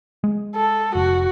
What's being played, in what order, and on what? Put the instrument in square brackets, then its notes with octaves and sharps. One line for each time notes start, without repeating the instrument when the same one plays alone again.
[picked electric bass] G#3
[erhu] A4
[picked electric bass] F1 [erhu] F#4